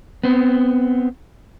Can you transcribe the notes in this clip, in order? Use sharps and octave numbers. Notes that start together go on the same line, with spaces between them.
B3 C4